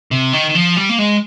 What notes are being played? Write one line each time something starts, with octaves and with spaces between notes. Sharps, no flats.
C3
D#3
D#3
F3
G3
A#3
G#3